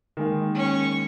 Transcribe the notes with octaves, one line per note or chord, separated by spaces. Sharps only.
D#3 G#3 A#3
C#4 C#6